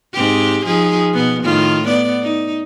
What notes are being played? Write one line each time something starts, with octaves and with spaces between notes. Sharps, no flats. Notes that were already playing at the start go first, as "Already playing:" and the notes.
G#2 C4 G4
F3 D#4 G#4
B2 B3
A2 D#3 F4
B3 D5
D#4